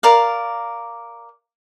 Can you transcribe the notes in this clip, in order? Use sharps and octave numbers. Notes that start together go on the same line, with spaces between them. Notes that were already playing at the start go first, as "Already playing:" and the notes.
A#4 D5 F5